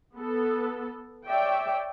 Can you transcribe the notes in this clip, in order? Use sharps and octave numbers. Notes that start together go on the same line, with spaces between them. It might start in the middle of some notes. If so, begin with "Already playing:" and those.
B3 A4
C#5 D5 E5 G5